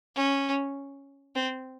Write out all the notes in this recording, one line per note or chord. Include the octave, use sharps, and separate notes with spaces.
C#4
C4